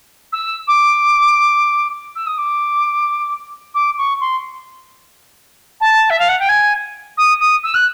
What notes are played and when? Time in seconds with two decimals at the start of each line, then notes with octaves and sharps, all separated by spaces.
0.32 E6
0.67 D6
2.15 E6
2.26 D#6
2.37 D6
3.74 D6
3.97 C#6
4.20 C6
5.80 A5
6.09 E5
6.19 F5
6.28 F#5
6.39 G5
6.48 G#5
7.17 D#6
7.39 D#6
7.63 E6
7.74 F#6